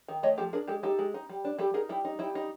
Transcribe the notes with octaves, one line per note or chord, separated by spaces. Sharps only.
D#3
A3 C#5 D#5
F3 G4 A4
D4 G#4 A#4
G#3 G4 A4
D#4 G4 A4
G#3
D#4
G3
D4
G3 G4 A4
D#4 G#4 A#4
G3 E4
D#4
G3 E4
D#4